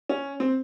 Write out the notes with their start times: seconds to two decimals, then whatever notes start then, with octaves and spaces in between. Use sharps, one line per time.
0.09 C#4
0.40 C4